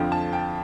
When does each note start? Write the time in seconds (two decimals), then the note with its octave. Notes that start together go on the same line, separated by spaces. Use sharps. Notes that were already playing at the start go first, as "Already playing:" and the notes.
Already playing: F2 D3 F3 G5
0.12 A5
0.33 G5